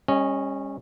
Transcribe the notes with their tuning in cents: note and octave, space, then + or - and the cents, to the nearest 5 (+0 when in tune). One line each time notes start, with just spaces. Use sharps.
G3 +40 C#4 -15 D#5 +0